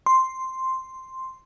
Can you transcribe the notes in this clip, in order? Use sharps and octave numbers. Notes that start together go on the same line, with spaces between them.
C6